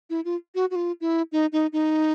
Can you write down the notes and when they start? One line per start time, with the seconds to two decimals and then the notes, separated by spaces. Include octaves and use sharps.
0.10 E4
0.25 F4
0.55 F#4
0.71 F#4
0.76 F4
1.01 E4
1.32 D#4
1.53 D#4
1.73 D#4